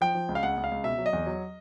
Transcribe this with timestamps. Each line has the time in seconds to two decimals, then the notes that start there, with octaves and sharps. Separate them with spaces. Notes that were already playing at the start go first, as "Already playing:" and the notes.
0.01 F3 G5
0.15 F3
0.29 C#2
0.35 F5
0.43 C#2 F#5
0.58 C#2
0.64 F5
0.71 C#2
0.84 B2 E5
0.98 F#3
1.06 D#5
1.13 E2
1.26 F#3